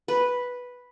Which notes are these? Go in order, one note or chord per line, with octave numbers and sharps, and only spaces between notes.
B4